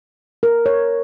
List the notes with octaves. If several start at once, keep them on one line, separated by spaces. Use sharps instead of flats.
A#4
C#5